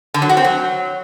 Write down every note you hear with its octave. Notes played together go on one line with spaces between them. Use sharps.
D3
F#3
F#4
C4
F#3